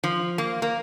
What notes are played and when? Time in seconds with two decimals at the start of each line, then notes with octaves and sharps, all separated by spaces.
0.04 F3
0.38 A#3
0.62 A#3